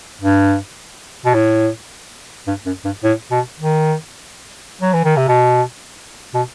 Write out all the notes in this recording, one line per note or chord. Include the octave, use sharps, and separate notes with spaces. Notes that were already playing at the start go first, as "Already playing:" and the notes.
G2
B2
A2
G2
F#2
G2
A2
B2
D#3
F#3
E3
D#3
C3
B2
B2